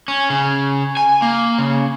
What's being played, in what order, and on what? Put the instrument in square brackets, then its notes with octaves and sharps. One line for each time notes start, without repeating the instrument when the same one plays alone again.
[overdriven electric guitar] C#4
C#3
G#5
A#3
C#3